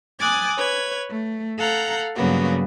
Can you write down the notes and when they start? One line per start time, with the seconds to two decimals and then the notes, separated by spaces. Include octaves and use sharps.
0.20 G#5 D6 D#6 F#6 G#6 A6
0.58 B4 C#5 G#6
1.08 A3
1.57 A4 F5 F#5 A#5 G6
2.15 G2 C#3 F#3 A#3 B3 F#4